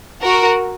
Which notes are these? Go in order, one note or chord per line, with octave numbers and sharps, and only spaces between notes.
F#4 A#4